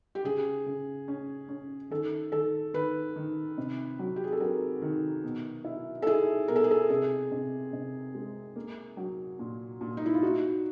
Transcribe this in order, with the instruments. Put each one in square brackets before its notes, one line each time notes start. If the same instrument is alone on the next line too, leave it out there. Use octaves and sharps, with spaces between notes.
[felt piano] G4
[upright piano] C#3 [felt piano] G#4
[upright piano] C#3
C#4
C#4
[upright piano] D#3 [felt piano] A4
[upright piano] D#3 [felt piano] A4
[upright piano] D#3 [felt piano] B4
[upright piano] D#3
C3
F#3
[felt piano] G4
G#4
A4
[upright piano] F#3 [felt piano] A#4
[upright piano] D#3
B2
E4
[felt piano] A4
[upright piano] E4 [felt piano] G#4
[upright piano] B2 [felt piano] A#4
[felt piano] A4
G#4
A4
[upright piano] C3 [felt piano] G#4
[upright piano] C3
C3
G#3
A#3
F#3
A#2
A#2
[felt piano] D#4
E4
F4
[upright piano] D#4 [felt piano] F#4